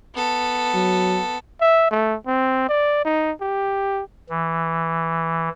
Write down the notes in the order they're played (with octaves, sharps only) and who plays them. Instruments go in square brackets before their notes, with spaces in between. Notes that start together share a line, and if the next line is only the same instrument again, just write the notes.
[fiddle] B3 A4
[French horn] F#3
[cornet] E5
A3
C4
D5
D#4
G4
[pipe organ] E3